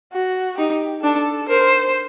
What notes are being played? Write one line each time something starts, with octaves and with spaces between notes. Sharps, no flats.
F#4
D#4 G4
D4 A4
A#4 C5